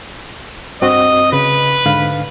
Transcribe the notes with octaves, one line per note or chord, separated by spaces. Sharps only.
G2 C4 F#4 D#5
C#3 B4
G#2 D3 F5